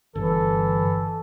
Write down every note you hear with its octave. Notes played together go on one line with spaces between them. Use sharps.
G1 E3 A4